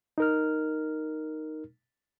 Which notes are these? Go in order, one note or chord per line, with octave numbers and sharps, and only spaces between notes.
D#4 A#4 F6